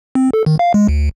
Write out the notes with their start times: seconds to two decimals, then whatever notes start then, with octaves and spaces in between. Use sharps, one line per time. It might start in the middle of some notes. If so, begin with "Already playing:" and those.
0.15 C4
0.33 A4
0.46 D#3
0.59 F5
0.74 G#3
0.88 D2